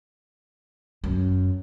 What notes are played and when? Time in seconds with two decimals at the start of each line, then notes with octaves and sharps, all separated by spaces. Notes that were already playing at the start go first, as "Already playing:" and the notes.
1.04 F#2